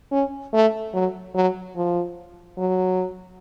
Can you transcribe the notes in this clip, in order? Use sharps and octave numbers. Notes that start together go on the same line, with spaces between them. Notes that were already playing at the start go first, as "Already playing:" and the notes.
C#4
A3
F#3
F#3
F3
F#3